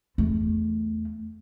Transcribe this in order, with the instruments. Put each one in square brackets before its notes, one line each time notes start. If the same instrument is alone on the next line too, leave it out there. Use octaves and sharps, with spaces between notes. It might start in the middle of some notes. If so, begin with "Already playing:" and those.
[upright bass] E2 A3